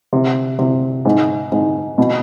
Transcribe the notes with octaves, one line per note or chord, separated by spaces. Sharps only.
C3
C3
G#2
G#2
B2